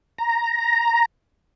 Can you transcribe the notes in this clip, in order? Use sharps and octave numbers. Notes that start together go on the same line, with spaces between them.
A#5